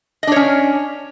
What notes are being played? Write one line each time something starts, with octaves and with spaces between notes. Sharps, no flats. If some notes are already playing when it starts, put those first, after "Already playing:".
C#4 D4 C#5 D#5